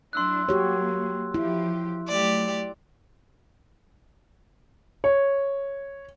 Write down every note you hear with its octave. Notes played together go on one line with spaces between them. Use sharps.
F#3 D4 E4 C6 E6 F#6
F#3 A#3 F#4 G4 C#5
F3 E4 G4
F#3 A3 G4 D5
C#5